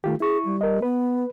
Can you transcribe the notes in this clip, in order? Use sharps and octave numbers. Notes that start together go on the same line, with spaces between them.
D#3 A3 F4 G4
E4 G#4 C#6
G3
A#4 D#5
B3 B4